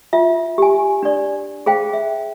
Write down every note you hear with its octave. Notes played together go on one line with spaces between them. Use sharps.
F4 E5
G4 G#5
D4 D5
G#4 C5 F5 G5
E5